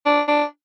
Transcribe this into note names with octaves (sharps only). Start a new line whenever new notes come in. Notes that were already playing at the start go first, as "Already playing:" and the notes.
D4
D4